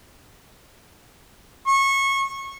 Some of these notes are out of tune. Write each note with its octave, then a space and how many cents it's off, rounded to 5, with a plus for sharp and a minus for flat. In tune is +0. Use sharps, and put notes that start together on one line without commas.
C#6 -20